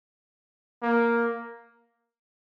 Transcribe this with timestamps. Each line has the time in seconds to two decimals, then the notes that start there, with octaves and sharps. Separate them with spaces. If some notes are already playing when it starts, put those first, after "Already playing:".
0.82 A#3